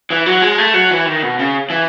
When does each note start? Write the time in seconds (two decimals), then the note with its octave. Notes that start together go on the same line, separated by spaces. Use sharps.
0.10 E3
0.26 F#3
0.42 G#3
0.58 A3
0.74 F#3
0.91 E3
1.06 D#3
1.22 B2
1.39 C#3
1.70 E3